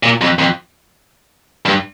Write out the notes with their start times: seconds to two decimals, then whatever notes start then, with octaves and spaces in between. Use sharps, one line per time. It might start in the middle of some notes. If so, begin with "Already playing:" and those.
0.03 A#2
0.21 F2
0.39 F2
1.65 G2